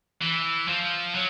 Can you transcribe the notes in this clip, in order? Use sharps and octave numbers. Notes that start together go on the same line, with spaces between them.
E3
F3
F#3